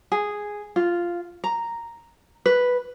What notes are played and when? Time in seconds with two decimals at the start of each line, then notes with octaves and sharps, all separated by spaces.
0.12 G#4
0.76 F4
1.44 A#5
2.46 B4